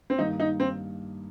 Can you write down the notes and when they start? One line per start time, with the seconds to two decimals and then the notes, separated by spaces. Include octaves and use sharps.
0.10 C4
0.18 G2 D#3 A#3 D#4
0.40 D#4
0.60 C4